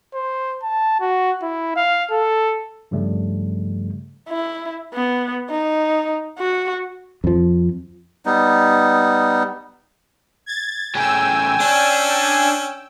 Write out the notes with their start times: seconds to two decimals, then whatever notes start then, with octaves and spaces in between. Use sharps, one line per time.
0.14 C5
0.63 A5
1.00 F#4
1.42 E4
1.76 F5
2.11 A4
2.91 G2 C#3 F3 G3 A3
4.29 E4
4.94 B3
5.50 D#4
6.38 F#4
7.24 F2 F3
8.25 G3 B3 D#4
10.46 G#6 A6
10.95 A2 C#3 G5 G#5 E6
11.60 C#4 D4